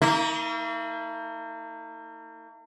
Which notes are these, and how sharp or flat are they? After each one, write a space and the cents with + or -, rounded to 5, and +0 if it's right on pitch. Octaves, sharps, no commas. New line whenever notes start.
A#3 -45 D#4 +45